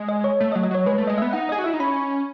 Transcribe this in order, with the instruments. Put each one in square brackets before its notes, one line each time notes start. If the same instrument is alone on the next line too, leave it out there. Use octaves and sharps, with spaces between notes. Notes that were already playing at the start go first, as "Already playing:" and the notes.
Already playing: [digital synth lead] G#3
[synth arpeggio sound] D#5
C#5
[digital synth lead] A3
[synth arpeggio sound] D#5
[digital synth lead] F#3
[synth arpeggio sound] D#5
[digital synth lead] F#3 [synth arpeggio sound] C#5
[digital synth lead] G#3 [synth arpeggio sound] B4
[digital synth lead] A3
[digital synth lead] G#3 [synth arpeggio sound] D#5
[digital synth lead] B3 [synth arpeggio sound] E5
[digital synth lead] D#4 [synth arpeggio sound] F#5
[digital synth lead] G#4 [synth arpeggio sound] D#5
[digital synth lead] F#4
[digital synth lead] E4 [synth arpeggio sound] E5
[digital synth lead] D#4
[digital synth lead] C#4 [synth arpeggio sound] B5